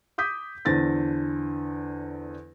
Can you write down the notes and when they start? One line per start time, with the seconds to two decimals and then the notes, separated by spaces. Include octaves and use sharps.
0.18 D6 D#6 G6 B6
0.65 E2 D3 C5 A6 A#6